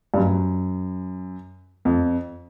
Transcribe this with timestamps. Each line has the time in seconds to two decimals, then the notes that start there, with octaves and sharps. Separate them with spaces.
0.14 G2
0.17 F#2
1.85 F2